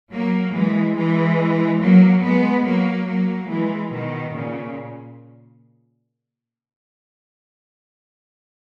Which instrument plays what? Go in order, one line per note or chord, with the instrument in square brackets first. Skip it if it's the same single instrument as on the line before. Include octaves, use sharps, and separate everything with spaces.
[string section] F#3 A#3
E3 G#3
E3 G#3
F#3 A#3
G#3 B3
F#3 A#3
F#3 A#3
E3 G#3
B2 D#3
A#2 C#3